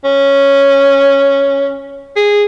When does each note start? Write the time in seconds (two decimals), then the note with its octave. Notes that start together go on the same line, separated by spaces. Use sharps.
0.04 C#4
2.16 G#4